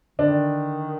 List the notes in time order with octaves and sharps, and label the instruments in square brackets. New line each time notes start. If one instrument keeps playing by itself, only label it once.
[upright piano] D3 D4 [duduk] D#3